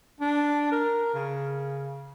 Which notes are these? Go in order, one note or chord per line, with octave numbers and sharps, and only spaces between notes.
D4
A#4
C#3